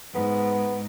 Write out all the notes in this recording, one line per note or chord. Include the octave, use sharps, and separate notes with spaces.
G#2 B3